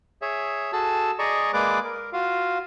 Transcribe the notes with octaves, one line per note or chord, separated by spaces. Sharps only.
G#4 C#5 E5
F#4 G#4 A4 A5 E6
G#4 D5 D#5 A#5 C#6
G#3 A#3 G#4 B4 D5 D6
A#4
F4 F#4 F5